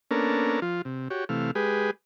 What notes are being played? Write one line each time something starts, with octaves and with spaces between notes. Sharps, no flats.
A#3 B3 C#4 D4 A4 A#4
F3 F4
C3
F#4 G4 C#5
C3 E3 A3 F5
G#3 G4 G#4 B4